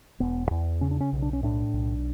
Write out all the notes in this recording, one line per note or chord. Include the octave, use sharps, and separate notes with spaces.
E1 B3
E2
C#3 C#4
D4
C#4
B1
D4
C#4
A2 D4
B1